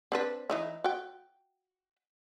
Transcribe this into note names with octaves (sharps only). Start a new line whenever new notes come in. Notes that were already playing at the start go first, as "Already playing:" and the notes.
C4 D4 B4
E3 D#4 E4
F#4 G5